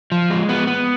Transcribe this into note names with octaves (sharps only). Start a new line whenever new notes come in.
F3
G#3
B3
B3